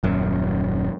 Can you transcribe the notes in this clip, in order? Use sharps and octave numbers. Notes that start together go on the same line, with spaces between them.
D#1 F#2